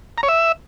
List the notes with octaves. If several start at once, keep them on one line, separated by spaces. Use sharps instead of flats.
A#5
C#5
E5